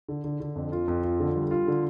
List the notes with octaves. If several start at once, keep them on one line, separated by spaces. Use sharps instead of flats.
D3
D3
D3
F2
F4
F2
F4
D3
G3
F4
D3